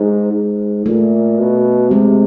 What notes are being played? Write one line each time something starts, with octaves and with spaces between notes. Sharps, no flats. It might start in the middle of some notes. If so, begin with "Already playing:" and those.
Already playing: G#2
G#2
A#2 A3
B2
C3 G#3